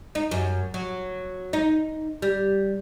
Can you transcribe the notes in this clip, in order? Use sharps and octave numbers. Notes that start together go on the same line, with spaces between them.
D#4
F#2
F#3
D#4
G3